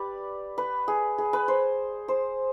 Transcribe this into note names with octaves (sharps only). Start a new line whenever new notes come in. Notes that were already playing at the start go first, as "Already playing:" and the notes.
Already playing: G4 B4 D5
B4
G#4
G#4
B4
C5
C5